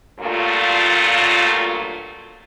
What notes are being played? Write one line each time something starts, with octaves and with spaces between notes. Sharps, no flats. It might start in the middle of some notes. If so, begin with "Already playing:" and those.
G2 A#2 F#3 A3 F4